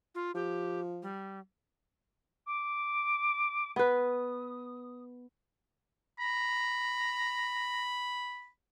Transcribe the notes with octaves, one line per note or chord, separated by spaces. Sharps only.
F4
F3 G4
G3
D6
B3 B4 D#6
A#5 B5